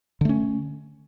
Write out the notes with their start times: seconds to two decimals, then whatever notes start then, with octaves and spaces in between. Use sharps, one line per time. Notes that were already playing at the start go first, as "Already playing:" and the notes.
0.21 D3
0.25 A3
0.29 C#4